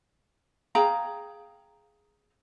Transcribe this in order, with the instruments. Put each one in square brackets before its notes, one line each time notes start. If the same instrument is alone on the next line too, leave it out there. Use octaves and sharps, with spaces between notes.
[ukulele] G#4 F5 G5 A#5